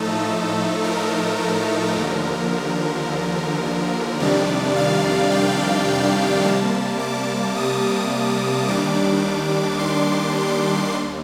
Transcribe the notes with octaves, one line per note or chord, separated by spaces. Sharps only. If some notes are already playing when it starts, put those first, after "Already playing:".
Already playing: A2 F3 A3 D#4 A4
A#4
A#4
D#2 D3 F3
F2 C3 D#3 G3 D4 D5
F5
G5
C3 G3 A#3 A5
D6
D#6
D#2 D#3 G3 D4 D6
C6
D#2